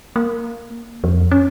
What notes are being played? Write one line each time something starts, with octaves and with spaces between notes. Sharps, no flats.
A#3
F2
C#4